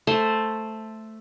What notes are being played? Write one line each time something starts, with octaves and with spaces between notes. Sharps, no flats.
A3 C5